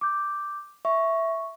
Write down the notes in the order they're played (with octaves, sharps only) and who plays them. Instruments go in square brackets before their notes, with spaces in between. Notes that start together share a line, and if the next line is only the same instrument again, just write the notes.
[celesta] D6 G6
[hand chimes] E5 [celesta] C#6